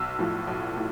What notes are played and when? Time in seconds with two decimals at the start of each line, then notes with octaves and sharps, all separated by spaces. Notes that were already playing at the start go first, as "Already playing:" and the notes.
Already playing: B1 E6
0.19 A2 F3
0.47 B1
0.77 A2